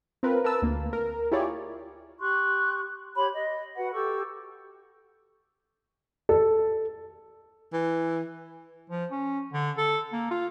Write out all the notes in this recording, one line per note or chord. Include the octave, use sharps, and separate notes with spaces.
C4 F4 A#4 B4
A#4 B4 A5 E6
D2 A#3
A#4
E4 F4 G4 G#4 C#5 D5
G4 C6 C#6 F#6
G4 C#5 B5 C6
D#5
F#4 B4 F#5
G4 A4 C#6 E6
A4
E3
F3
C#4
D3
A4
A#3
F4